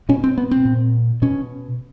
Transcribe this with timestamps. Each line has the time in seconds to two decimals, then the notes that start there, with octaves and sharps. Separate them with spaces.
0.09 B2 C#4
0.24 C4
0.38 B3
0.51 C4
0.65 A#2
1.22 B2 C#4